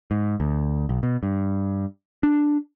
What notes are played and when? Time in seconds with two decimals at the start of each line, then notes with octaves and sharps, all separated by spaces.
0.11 G#2
0.40 D2
0.89 B1
1.03 B2
1.23 G2
2.23 D4